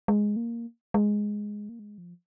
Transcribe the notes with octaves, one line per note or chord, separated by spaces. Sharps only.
G#3
A#3
G#3
A#3
G#3
F3